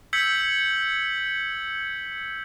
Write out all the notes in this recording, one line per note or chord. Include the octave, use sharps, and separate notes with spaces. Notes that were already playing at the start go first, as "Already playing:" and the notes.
E6 G6 G#6 B6 C#7 F#7